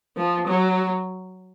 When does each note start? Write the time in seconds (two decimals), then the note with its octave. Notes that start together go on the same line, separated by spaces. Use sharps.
0.17 F3
0.47 F#3